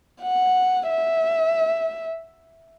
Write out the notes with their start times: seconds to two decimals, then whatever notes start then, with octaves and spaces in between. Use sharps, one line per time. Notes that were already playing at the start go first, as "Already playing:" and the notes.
0.21 F#5
0.90 E5